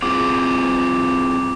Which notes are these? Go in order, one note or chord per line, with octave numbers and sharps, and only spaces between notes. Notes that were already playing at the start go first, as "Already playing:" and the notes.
C4 F4 G#4 D6